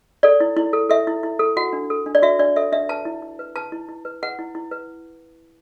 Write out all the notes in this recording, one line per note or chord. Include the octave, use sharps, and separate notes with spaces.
A4 D5
E4
E4
A4
A4 E5
E4
E4
A4
F#4 F#5
D4
A4
D4
D5
F#4 E5
D4 D5
A4 E5
D4 E5
B4 A5
E4
E4
B4
B4 A5
E4
E4
B4
B4 F#5
E4
E4
B4